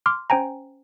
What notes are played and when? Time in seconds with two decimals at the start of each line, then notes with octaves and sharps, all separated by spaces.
0.06 C6 D6 F6
0.30 C#4 C5 G5 G#5 A#5